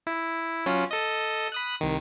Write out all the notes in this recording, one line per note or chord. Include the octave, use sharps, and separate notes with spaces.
E4
F#3 C#4 F4
A4 D#5
B5 D#6 F#6
C2 D#3